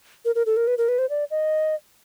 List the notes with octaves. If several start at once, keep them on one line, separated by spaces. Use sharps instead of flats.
A#4
A#4
A4
A#4
B4
A#4
B4
C5
D5
D#5